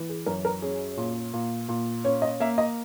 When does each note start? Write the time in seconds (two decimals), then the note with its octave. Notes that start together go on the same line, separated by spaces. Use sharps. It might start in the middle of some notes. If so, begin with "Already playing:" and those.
Already playing: E3
0.09 G#4
0.26 F#2 A#4
0.45 A#4
0.62 C#4 G#4
0.97 A#2
1.33 A#2
1.68 A#2
2.04 C#4 C#5
2.22 D#5
2.40 A#3 E5
2.58 D#5